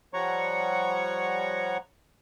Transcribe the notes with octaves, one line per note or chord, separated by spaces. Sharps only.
F3 G3 C#5 F#5 A#5 C#6